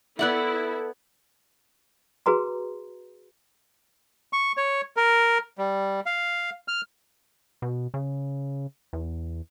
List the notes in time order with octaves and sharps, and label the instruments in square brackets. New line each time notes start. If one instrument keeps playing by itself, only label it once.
[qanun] B3 D5 F#5 [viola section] E4 [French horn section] A4 [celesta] E5 F#6
[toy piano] F#4 G#4 B4 A#5 C6
[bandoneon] C#6
C#5
A#4
G3
F5
F6
[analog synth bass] B2
C#3
E2